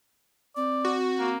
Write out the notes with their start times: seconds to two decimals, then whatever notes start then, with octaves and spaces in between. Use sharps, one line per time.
0.56 C4 D5
0.85 F#4
1.19 A#3